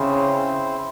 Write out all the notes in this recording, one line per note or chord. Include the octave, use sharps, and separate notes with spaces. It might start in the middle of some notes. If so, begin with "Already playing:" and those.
Already playing: C#3 C4 E4 C5